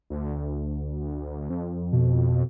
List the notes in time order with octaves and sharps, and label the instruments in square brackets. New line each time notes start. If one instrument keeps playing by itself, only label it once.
[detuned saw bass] D2
F2
[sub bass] B2